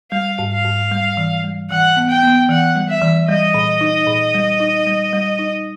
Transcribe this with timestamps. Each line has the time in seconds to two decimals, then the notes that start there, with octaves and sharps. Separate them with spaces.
0.12 G3 F5
0.39 G#2
0.52 F5
0.64 G#2
0.92 G3
1.17 E3
1.44 G3
1.71 E3 F#5
1.97 B3
2.09 G5
2.23 B3
2.49 E3 F#5
2.76 G3
2.89 E5
3.02 E3
3.29 G3 D#5
3.54 A#2
3.81 D#4
4.07 A#2
4.34 G3
4.60 D#4
4.87 G3
5.13 G3
5.39 D#4